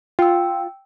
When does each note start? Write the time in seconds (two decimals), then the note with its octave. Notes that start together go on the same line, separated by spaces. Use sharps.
0.19 F4 G5 E6